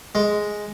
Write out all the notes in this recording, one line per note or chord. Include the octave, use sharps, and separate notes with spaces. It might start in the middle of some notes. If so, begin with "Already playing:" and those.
G#3